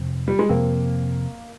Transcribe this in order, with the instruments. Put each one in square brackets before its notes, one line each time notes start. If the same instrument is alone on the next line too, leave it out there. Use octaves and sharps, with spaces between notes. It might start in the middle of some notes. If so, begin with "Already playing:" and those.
Already playing: [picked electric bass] F2 C3 F3 C4
[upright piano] G3
G#3
[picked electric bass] F2 C3 F3 C4 [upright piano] A#3